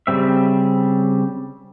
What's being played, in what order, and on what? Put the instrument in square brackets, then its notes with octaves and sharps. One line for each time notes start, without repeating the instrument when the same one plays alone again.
[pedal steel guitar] C#3 G3 C4 E5